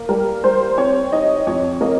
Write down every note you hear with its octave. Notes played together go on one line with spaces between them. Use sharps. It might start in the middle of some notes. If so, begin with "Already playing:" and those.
Already playing: A#3
G3 A#4
G3 C5
C4 C#5
D#4 D#5
F2 C#5
A#3 D#5